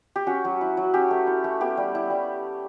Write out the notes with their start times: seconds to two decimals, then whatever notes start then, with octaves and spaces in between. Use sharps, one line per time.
0.16 G4
0.27 C#4 F#4
0.45 F#3
0.61 E4
0.77 F#3
0.94 C#4 G4
1.11 A3
1.27 E4
1.44 A3
1.61 B3 G4
1.77 G3
1.95 E4
2.10 G3